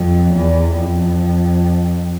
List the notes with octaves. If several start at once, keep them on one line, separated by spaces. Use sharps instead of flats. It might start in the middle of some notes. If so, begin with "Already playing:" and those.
Already playing: F2
E2
F2